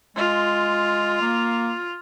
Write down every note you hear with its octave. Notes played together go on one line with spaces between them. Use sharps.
G#3 F4
A#3